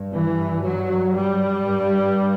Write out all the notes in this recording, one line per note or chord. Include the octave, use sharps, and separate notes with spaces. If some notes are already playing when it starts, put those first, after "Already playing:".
Already playing: G2
E3
F#3
G3
G2